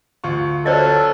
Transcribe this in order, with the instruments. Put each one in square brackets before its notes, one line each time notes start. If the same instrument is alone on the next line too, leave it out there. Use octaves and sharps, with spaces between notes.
[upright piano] D2 F4 C#6
[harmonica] F#3 C#4 [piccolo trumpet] A4 [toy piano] C5 D5 D#5